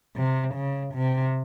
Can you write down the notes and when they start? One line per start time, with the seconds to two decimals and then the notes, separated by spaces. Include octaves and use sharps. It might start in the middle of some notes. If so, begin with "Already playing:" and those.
0.16 C3
0.55 C#3
0.94 C3